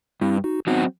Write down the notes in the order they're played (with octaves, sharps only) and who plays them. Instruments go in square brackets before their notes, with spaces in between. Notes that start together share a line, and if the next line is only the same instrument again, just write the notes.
[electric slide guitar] G2 [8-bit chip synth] C4 E4
[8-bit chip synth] D#4 F#4
[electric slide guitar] F#3 C4 F#4 [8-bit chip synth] B3 D#4